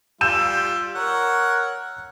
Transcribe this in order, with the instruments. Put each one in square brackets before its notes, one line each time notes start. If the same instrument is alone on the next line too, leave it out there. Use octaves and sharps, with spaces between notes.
[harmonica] G3 F4 [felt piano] E6 G6 E7
[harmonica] A#4 C#5 F#5